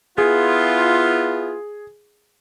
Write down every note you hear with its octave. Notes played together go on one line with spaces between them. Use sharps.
B3 E4 F4 G#4